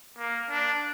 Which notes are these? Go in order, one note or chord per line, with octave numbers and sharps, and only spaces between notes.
A#3
D4